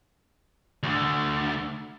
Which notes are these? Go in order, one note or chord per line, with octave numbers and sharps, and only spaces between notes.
D2 D3